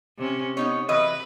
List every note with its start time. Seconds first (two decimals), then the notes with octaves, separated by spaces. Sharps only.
0.18 C3 C#4
0.57 B3 C#4 D#4 C#5
0.89 E3 F#3 B4 D#5